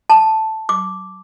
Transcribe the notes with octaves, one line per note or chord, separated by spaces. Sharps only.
A5
D6